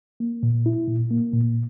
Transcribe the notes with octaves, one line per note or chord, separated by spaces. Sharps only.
A#3
A#2
E4
A#2
A#3
A#2